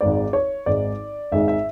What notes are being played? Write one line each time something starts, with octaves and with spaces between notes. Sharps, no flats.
G#1 G#2 G#3 D5
C#5
G#1 G#2 G#3 D5
G#1 G#2 G#3 E5
E5